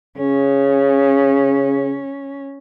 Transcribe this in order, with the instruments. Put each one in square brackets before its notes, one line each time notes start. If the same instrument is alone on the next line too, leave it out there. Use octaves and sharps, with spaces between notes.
[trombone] C#3 [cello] C#4